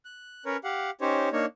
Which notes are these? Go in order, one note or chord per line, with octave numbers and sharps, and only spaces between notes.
F#6
C#4 A#4 B4 C#5
G4 F5 F#5
C#4 D#4 G4 C5 C#5
A#3 D4 D#4 C#5